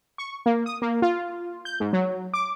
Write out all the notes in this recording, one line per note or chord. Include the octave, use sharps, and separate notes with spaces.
C#6
A#3
D#6
A#3
F4
G6
G#2
F#3
D6